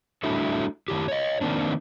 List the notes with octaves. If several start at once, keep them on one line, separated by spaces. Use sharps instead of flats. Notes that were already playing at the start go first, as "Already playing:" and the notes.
G3 A3 D4 E4 F#4 A4
D#3 E4 G4
C#5 D#5
D#3 A#3 C4 D4